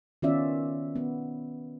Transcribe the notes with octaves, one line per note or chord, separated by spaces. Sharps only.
D#3 B3 C#4 F4 D5 E5
B3